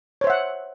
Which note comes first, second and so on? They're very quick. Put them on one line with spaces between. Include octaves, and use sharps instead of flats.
C#5 C5 E5 F#5